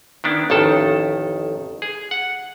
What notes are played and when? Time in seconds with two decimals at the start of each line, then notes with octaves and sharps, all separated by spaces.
0.24 D#3 B3 D4 E4
0.50 A1 F2 D#3 A4 A5
1.82 G#4
2.11 F#5